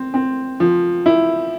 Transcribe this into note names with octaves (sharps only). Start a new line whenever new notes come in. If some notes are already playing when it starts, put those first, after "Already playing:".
Already playing: C4
C4
F3
E4